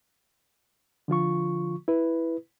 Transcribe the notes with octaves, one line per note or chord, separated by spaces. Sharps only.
D3 F3 F4 C#6
E4 B4